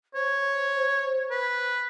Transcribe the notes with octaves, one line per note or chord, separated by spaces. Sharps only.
C5 C#5
B4